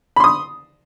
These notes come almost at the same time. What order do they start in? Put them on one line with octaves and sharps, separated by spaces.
B5 C6 D#6